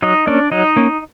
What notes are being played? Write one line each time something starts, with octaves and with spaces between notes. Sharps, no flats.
F#3 D#4 D#5
A#3 C#4 D4 D5
F#3 D#4 D#5
A#3 C#4